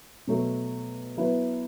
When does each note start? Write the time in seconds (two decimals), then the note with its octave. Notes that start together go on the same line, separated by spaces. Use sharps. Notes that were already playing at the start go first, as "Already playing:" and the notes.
0.27 B2 F#3 A3
1.17 F#3 B3 E4